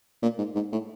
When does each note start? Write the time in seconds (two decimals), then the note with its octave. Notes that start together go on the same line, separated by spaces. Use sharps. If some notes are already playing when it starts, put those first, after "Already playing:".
0.23 A#2
0.38 G#2
0.55 G#2
0.72 A2